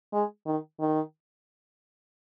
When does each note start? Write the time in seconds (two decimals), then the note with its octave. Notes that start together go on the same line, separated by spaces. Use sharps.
0.13 G#3
0.47 D#3
0.80 D#3